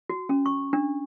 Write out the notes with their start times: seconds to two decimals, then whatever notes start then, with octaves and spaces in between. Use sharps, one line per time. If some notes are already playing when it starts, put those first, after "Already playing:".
0.10 F#4
0.29 C#4
0.46 C#6
0.73 D4